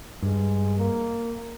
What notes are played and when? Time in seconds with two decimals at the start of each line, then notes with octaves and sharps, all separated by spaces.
0.23 G2 G#3
0.78 A#3